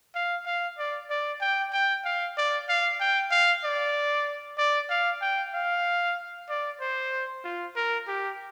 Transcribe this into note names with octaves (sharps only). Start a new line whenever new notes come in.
F5
F5
D5
D5
G5
G5
F5
D5
F5
G5
F5
D5
D5
F5
G5
F5
D5
C5
F4
A#4
G4